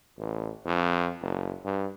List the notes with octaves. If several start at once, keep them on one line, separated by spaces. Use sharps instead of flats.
A1
F2
F#1
G2